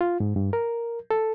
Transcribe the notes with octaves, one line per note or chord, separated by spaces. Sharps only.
F4
G#2
G2
A#4
A4